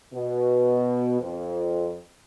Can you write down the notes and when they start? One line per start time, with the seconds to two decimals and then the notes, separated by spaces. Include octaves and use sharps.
0.13 B2
1.21 F2